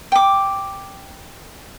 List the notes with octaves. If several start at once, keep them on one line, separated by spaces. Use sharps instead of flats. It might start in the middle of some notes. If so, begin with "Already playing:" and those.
G5 D6